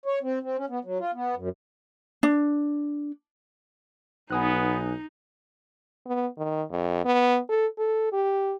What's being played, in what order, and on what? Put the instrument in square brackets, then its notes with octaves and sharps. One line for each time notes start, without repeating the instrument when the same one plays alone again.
[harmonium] C#5
C4
C4
C#4
B3
F#3
F4
B3
F#2
[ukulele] D4
[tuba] B1 [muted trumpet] B3 [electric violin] D#4 [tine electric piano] G#5 D#6 F#6
[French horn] B3
D#3
F2
B3
A4
A4
G4